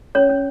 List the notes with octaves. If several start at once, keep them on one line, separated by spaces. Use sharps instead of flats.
C#4 C#5
C#4